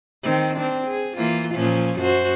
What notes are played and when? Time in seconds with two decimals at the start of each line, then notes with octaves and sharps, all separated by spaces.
0.23 D#3 C4
0.56 C4 D4
0.88 G#4
1.17 E3 A#3 F4
1.55 A#2 F3 C#4
2.00 F#2 F#4 C5